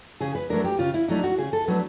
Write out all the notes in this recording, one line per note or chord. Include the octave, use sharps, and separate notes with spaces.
C#3 G#4
B4
F#3 A3 D4 A#4
G4
C#3 F4
E4
F#3 A3 D4 D#4
F#4
C#3 G#4
A4
F#3 A3 D4 B4